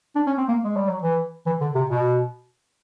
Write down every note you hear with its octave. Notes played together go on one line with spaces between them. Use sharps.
D4
C#4
C4
A#3
G#3
G3
F#3
E3
E3
D3
C3
B2